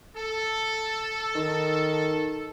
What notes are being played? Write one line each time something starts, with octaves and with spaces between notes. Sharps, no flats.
A4
D#3